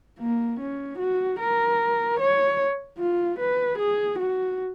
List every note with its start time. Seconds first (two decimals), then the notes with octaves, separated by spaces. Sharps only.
0.19 A#3
0.59 C#4
0.99 F#4
1.39 A#4
2.19 C#5
2.99 F4
3.39 B4
3.78 G#4
4.18 F#4